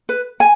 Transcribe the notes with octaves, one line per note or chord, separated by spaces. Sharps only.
B4
G#5